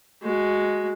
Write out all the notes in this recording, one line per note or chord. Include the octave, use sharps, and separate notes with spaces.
G#3 F#4